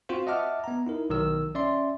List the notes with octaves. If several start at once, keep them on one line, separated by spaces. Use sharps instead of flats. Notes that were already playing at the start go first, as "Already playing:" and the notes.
C4 F4 F#4 C5
D#5 E5 F#5 A5 D6 F6
B3 A#5
D#4 E4 A#4
B1 D#3 A#4 E6
C#4 D5 E5 C6